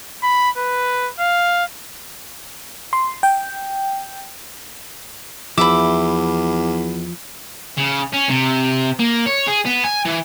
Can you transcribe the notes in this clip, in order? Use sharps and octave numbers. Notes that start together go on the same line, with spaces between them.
B5
B4
F5
C6
G5
E2 F3 E5 B5 D6
C#3
C#4
C3
A#3
C#5
G#4
B3
G#5
E3